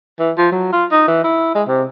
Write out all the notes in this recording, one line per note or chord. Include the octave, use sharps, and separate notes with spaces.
E3
F3
F#3
F4
D#4
E3
E4
G#3
C3